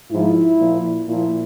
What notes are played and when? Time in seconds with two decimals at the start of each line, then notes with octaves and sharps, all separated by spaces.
0.11 G#2 F3 E4
0.60 A#2 F3
1.08 A#2 F3 E4